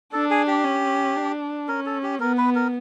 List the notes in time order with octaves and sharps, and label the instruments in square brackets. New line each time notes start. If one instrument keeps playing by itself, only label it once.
[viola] D4 [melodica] A4
[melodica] G#4
G4
[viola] C#4
D4
[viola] C#4 [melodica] A#4
[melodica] A4
G4
[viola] B3 [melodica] A#4
[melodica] B4
A#4